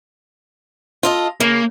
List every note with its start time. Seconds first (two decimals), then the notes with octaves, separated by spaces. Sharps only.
1.03 F4 A4 D#5
1.40 C#3 A#3